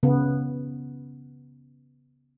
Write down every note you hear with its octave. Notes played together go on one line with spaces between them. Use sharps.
C#3 B3